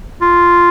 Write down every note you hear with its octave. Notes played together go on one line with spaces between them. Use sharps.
F4